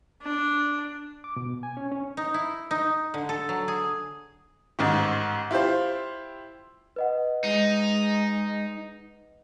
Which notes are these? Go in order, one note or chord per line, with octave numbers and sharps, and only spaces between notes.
D4
D6
B2
G#5
C#4
C#4
D#4
E4
D#4
D3
A4
F#3
G#4
A1 G#2 D#3
E4 F4 G4 C5
B4 D#5 F#5
G#3 D#4